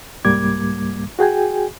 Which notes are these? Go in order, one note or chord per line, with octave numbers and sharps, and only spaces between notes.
C2 G#2 G3 A#3 D6 G#6
F#4 G#4 G5 G#5